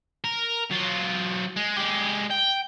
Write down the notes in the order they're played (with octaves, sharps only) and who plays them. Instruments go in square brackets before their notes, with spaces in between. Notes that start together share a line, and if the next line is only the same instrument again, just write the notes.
[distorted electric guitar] A#4
F#3 F4
G#3
G#3 G4
G5